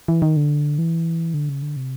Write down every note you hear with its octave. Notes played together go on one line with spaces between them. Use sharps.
E3
D#3
D3
E3
D3
C#3
D3
C3